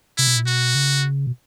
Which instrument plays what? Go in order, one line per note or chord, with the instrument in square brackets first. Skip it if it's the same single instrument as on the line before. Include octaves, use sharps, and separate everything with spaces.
[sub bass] C3 [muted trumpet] E4
[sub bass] B2
A#2
[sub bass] B2 [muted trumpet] F#4
[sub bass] C#3
B2